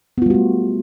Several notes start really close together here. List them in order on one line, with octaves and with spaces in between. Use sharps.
B3 F4 G3 F#4 A3